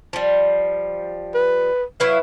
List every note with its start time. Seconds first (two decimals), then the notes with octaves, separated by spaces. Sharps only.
0.13 F3 G3
1.34 B4
2.00 F#3 E4 B4 F5